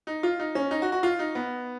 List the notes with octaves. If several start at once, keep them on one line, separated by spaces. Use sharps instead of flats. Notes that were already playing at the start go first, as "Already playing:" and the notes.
D#4
F4
D#4
C#4
D#4
F#4
F#4
F4
D#4
B3